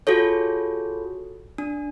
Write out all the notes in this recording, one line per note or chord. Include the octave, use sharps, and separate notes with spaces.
F4 F#4 G#4 A4 C#5
D4